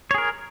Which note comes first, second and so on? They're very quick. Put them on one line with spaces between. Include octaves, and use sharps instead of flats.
C#5 G#4 A#4